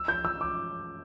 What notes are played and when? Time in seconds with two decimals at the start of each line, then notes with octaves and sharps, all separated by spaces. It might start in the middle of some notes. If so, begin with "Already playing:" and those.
Already playing: E6
0.08 G6
0.25 E6
0.41 D6